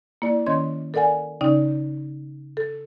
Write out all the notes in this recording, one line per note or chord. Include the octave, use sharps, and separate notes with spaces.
A#3 E4 D5
D#3 C#4 C#5 D#5 C6 G#6
A4 A#4 D5 F#5 G#5
C#3 C#4 D#4 D5 G5
A4